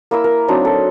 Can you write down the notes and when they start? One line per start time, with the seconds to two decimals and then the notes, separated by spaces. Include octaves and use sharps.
0.11 A#3 E4 A#4 E6
0.24 A#4
0.48 F#3 C4 D4 D#4
0.65 A4